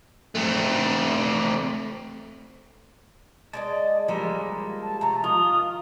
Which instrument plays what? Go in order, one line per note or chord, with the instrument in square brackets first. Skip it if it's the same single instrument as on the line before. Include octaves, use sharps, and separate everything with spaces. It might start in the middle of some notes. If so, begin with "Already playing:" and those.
[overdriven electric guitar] A3 C4
[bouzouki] G#3 D5 D#5 [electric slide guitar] A5
[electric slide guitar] F3 G3 G#3 [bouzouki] A#3 A4 A#4
[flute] A5
[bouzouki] C3 A3 [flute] A#5
[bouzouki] D#3 [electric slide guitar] F4 [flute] D#6